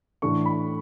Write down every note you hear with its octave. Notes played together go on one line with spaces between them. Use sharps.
A2 E3 A3 D4 C#6
B5